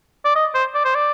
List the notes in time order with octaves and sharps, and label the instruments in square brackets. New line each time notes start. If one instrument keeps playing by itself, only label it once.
[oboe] D5
D#5
C5
D5
C5
D5